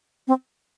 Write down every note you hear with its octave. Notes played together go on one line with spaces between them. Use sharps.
C4